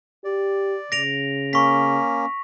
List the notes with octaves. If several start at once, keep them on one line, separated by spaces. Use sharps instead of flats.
G4 D5
C#3 A#6 D7 F7
A#3 C#4 C#6 B6